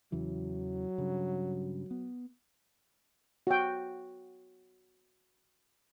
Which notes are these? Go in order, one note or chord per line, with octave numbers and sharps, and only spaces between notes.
E2 C#3 E3 F#3
G2 C#3
B3
F#4 G5